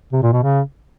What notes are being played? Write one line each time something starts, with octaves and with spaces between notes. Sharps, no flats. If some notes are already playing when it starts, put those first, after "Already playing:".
C3
A#2
B2
C#3